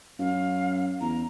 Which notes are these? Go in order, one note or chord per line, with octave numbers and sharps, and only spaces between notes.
F#2 F5
E2 A#5